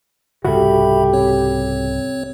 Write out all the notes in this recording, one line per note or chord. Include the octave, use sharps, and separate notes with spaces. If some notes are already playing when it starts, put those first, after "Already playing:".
C2 G#2 C#3 F#4 G4 A4 E5 B5
C4 C#5